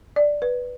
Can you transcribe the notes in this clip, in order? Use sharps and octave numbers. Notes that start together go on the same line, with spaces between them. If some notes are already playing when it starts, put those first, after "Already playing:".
D5
B4